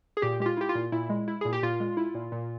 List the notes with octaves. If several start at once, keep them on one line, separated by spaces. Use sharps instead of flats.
G#4
A#2 G4
G#3 G4
F4
E4 G4
F4
A#2
A#2 E4
G#3
E4
A#2 G#4
G4
A#2 F4
G#3
E4
A#2
A#2